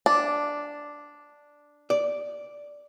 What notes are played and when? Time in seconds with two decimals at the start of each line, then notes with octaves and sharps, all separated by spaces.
0.06 D4
1.90 D5